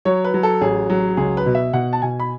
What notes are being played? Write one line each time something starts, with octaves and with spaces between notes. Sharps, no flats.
F#3 C#5
B4
F#3
A4
A1 G#4
F#3
C#2 G#4
B4
B2
E5
B2 F#5
A5
B2 G#5
B5